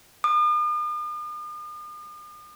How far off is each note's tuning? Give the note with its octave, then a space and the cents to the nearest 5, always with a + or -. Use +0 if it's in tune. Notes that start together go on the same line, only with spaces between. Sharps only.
D#6 -45